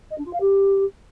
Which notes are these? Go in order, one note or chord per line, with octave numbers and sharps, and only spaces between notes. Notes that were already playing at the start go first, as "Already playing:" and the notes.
D#5
D4
F4
F5
G4